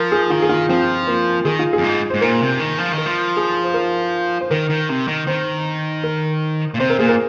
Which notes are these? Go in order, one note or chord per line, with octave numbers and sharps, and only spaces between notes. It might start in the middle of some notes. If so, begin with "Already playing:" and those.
Already playing: F3 A#4
G#4
D#3 F4
G#4
F4
F3 C4
A#3
D#3 G#4
F4
G#4
F2
G#2
G#2 C5
A#2 A#4
C3
D#3
F3
D#3
A#4
F3
G#4
C5
A#4
C5
D#3 A#4
D#3
C3
D#3
D#3 C5
A#4
A#2
C3 C5
A#4
A#2 G#4
A#4